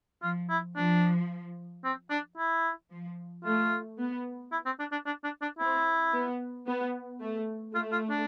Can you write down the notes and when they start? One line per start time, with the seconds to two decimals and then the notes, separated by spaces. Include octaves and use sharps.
0.22 F3 F4
0.49 E4
0.76 F3 D4
1.84 C4
2.10 D4
2.37 E4
2.91 F3
3.44 A3 F4
3.99 B3
4.52 E4
4.66 C4
4.79 D4
4.92 D4
5.06 D4
5.24 D4
5.41 D4
5.59 C4 E4
6.13 B3
6.67 B3
7.21 A3
7.74 A3 F4
7.92 F4
8.10 D4